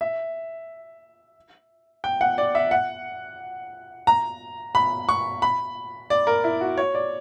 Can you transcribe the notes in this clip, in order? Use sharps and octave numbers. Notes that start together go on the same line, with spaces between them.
E5
G5
F#5
D5
E5
F#5
A#5
B5
C#6
B5
D5
A#4
E4
F#4
C#5
D5